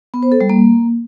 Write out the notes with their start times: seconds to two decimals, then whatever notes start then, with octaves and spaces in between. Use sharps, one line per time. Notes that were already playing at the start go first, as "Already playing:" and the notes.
0.14 B3
0.23 C5
0.32 A4
0.41 G3
0.50 A#3